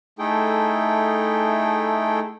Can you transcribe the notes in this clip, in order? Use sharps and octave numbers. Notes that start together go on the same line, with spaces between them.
A3 D#4 E4 G#4 A4 G5